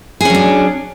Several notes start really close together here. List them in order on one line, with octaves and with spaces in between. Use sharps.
G#4 C#4 F#3 D4